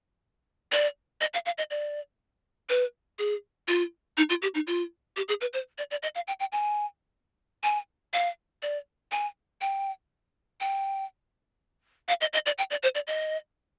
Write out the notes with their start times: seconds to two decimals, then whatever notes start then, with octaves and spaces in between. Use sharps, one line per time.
0.72 D5
1.21 D#5
1.34 F5
1.46 F5
1.58 D#5
1.71 D5
2.69 B4
3.19 G#4
3.68 F4
4.17 D#4
4.30 F4
4.42 G4
4.55 D#4
4.67 F4
5.17 G4
5.28 G#4
5.41 B4
5.53 C5
5.78 D5
5.91 D5
6.03 D#5
6.15 F5
6.28 G5
6.40 G5
6.52 G#5
7.63 G#5
8.13 F5
8.63 D5
9.12 G#5
9.61 G5
10.60 G5
12.08 F5
12.21 D#5
12.33 D#5
12.46 D5
12.58 G5
12.71 D5
12.83 C5
12.95 D5
13.07 D#5